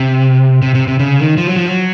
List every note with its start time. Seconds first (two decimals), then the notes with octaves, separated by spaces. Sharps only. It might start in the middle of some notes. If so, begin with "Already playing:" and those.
Already playing: C3
0.62 C3
0.75 C3
0.88 C3
0.99 C#3
1.19 D#3
1.37 F3
1.47 F#3
1.56 F3
1.66 F#3